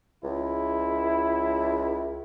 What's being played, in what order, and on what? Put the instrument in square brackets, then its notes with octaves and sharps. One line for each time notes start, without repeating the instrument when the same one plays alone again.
[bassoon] C#2 [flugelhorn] E4